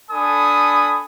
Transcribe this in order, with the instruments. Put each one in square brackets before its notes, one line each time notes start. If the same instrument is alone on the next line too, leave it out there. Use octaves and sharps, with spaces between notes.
[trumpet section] D4 A4 G#5 B5 D#6